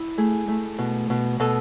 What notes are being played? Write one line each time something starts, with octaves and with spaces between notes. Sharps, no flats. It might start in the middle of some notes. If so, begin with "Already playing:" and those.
Already playing: E4
A3 G#4
A3
B2
B2
B2 A4